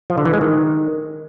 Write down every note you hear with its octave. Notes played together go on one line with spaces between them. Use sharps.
F3
D3
E3
G#3
D#3